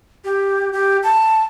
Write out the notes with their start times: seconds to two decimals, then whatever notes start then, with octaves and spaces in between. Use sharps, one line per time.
0.24 G4
0.73 G4
1.03 A5